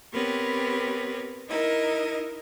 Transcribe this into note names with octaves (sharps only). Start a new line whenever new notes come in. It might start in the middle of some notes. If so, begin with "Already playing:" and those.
B3 C4 G4 A#4 B4 C#5
D#4 E4 A#4 D#5